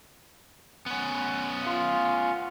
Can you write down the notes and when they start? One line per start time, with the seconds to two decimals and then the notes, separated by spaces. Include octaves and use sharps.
0.86 B3 C#4
1.63 F4